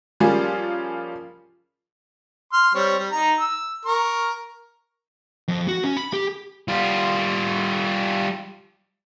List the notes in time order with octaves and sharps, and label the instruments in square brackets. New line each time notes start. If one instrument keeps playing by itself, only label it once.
[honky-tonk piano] F3 G3 A#3 C#4 F4 G#4
[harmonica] C6 F6
G3 C4 C#5
G3
D#4 A#5
E6
A#4 C#6
[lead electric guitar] F2
F#4
C#4
B5
G4
[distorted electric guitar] G3 F4